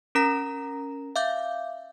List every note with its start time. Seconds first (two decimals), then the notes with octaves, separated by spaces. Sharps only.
0.15 C#4 A#4 A#5 A#6
1.16 E5 F5 D6 G6